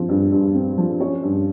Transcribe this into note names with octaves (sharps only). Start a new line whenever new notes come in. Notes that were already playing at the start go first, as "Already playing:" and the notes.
Already playing: F3 C4
G2
G2
C4
F3
C#4 C#5
G2